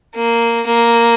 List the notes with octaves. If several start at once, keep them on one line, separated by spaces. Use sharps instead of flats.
A#3
A#3